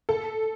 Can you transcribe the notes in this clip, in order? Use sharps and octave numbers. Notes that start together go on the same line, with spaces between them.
A4